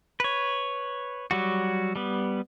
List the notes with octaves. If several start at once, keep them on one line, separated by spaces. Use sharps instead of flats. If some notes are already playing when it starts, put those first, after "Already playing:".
B4 C#5
F#3 G3 F#4
G3 B3